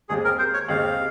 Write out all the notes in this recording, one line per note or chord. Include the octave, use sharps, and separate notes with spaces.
D#2 C#3 G#3 C4 G4 G#4
A#4
C5
C#5
D#2 C#3 G#3 C4 G4 F5